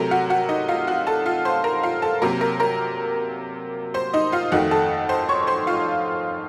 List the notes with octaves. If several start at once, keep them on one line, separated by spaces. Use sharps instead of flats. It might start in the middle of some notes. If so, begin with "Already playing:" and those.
Already playing: C3 F#3 A3 A#4 A#5
F#4 F#5
F#4 F#5
D#4 D#5
F4 F5
F#4 F#5
A4 A5
F4 F5
C5 C6
A#4 A#5
F4 F5
A4 A5
C3 F#3 A#3 A#4 A#5
A#4 A#5
A#4 A#5
C5 C6
D#4 D#5
F4 F5
F2 D#3 A3 F#4 F#5
A4 A5
C5 C6
C#5 C#6
C5 C6
F4 F5